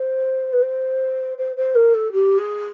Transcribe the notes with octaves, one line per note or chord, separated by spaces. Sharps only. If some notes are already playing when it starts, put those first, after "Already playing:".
Already playing: C5
B4
C5
C5
C5
A#4
A4
G4
G#4